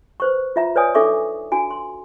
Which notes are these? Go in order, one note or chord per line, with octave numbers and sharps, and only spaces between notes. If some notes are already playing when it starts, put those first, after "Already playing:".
B4 C5 C#6
F4 E5 A#5
B4 C#5 D5 G#5 D#6
D4 D#4 A4 E5 C#6 D6
D4 F#4 G#5
C6